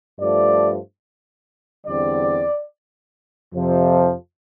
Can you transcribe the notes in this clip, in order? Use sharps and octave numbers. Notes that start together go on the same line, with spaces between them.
G2 F3 A3 D5
E2 D3 G3 C4 D5
F2 C3 F3